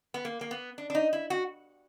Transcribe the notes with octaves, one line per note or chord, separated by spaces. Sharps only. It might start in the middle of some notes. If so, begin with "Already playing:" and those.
B3
A#3
A#3
B3
D4
D4
D#4
E4
F#4